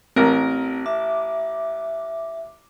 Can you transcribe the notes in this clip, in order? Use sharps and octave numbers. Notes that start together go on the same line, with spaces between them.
A1 C4 A#4
E5 D6